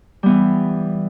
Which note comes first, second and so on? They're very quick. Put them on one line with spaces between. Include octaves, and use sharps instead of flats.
G3 B3 E3